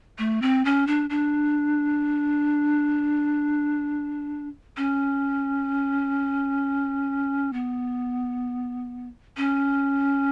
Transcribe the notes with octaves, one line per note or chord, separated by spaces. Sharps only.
A3
C4
C#4
D4
D4
C#4
B3
C#4